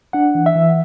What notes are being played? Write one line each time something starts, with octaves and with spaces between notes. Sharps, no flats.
D4 F#5
E3
E5
E3